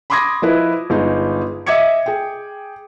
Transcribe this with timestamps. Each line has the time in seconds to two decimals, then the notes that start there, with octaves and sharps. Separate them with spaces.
0.10 B5 C6 D6 D#6 G#6 A#6
0.42 F3 E4 B4 D#5
0.90 G1 G#3 D#4
1.66 D#5 E5 D6 G#6 C#7
2.06 G#4 G5